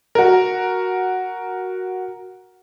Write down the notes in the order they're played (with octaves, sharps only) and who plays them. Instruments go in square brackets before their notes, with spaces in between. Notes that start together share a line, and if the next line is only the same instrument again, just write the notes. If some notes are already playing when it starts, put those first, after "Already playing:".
[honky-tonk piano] F#4 A#4